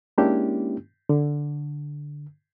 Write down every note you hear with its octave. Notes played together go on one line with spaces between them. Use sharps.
G#3 A#3 C#4 D4 E4 G4
D3